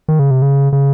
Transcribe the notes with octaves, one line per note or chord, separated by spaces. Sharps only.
D#3
C#3
C3
C#3
C#3